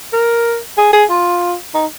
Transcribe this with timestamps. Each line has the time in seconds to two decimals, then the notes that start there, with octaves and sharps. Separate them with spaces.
0.13 A#4
0.78 G#4
0.93 G#4
1.10 F4
1.74 D#4